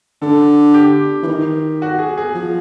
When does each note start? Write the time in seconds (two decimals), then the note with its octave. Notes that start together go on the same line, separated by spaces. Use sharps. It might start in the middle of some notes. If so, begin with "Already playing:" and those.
0.22 D3 A4
0.74 G4
1.23 E3
1.28 D#3
1.82 F#4
1.99 G#4
2.18 G#4
2.35 F3